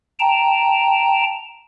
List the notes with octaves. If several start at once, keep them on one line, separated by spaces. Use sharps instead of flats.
G5 A5 A#5